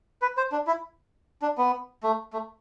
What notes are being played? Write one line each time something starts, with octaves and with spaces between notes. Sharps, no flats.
B4
C5
D4
E4
D4
B3
A3
A3